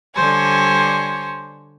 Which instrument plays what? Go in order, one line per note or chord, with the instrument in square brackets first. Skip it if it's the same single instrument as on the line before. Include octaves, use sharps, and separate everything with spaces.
[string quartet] D3 G3 C5 C#5 G#5